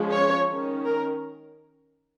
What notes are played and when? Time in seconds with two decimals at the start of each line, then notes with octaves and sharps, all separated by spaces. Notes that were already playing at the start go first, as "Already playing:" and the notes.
Already playing: F3 G#3 C#4
0.12 C#5
0.49 D#3 C#4
0.86 A#4